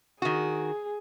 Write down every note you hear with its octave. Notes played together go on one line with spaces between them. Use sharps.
D#3 F#4 G#4